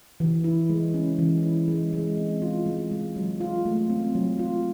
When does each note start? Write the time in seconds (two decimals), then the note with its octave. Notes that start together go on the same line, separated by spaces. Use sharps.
0.20 E3
0.44 E4
0.70 G#3
0.94 C#4
1.19 E3
1.43 E4
1.68 G#3
1.93 G#3
2.17 C4
2.42 F4
2.66 G#3
2.91 G#3
3.16 F#3
3.40 F4
3.65 A3
3.90 C4
4.15 F#3
4.39 F4